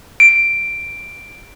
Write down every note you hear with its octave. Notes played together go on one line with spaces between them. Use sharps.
D7